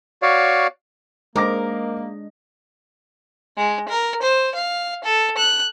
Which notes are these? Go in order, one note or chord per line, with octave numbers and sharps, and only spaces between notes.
F#4 C#5 D5 F5
G#3 A#3 D4 A#4 C5 D#5 D6 A#6
G#3
A#4
C5
F5
A4
F#6